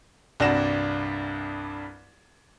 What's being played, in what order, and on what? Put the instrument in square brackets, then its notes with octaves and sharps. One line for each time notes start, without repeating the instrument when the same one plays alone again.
[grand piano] C2 G2 D4 F#4 A#6 E7